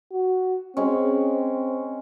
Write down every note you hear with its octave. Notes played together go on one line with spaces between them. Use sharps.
F#4
G#3 C4 C#4